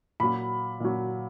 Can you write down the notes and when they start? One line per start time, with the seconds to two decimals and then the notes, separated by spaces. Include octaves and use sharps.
0.20 A#2 F#3 B5
0.80 A#2 F#3